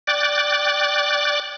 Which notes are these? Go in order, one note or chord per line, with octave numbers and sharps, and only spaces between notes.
D5 G5 D6 F#6 A6